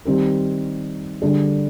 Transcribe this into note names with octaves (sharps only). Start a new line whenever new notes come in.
D#3 G3 C4 G4 A#4
D3 G3 D4 G#4